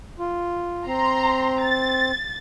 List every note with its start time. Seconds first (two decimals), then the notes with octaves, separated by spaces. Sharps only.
0.19 F4
0.87 C4 A#5 C6
1.60 A6